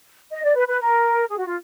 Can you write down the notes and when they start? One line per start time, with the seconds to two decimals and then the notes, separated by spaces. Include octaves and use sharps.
0.32 D#5
0.44 D5
0.56 B4
0.68 B4
0.81 A#4
1.30 G#4
1.38 F#4
1.47 F4